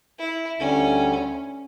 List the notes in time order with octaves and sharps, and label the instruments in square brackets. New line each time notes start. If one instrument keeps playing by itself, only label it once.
[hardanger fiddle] E4
[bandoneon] D2 D3 G3 [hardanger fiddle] C#4